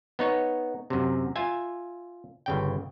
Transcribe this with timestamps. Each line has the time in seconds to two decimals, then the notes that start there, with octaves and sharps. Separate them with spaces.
0.19 B3 D#4 C#5
0.90 F#2 C3
1.36 F4 E5 G#5
2.46 G1 C#3 G5